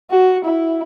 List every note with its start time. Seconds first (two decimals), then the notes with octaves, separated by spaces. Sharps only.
0.10 F#4
0.45 E4